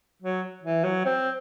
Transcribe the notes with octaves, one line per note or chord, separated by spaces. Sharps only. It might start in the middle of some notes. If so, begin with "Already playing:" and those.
F#3
E3
F#3
C4